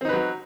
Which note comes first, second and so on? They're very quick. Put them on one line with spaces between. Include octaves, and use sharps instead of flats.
C4 D#4 B4 F#3